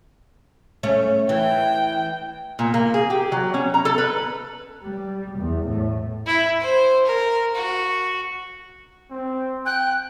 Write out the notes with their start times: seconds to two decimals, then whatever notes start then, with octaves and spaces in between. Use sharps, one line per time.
0.83 A3 C#4
1.29 E3 G5
2.59 A#2
2.74 A#3
2.94 G#4
3.10 G4
3.32 F#3
3.54 C#4
3.74 A#5
3.85 A4
3.98 B4
4.82 G3
5.39 E2
5.68 A2
6.27 E4
6.61 C5
7.06 A#4
7.55 F#4
9.10 C4
9.66 G5 F#6